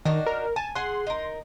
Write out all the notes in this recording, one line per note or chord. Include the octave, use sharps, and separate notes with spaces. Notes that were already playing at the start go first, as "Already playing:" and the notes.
D#3 D4 D#4 F#4
A#4
G#5 A5
G#4 F#5 C6
D#4 A#4